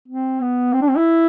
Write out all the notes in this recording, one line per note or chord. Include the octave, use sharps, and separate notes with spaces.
C4
B3
C4
D4
C4
E4